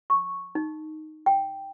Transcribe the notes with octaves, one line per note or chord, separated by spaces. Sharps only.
C#6
D#4
G5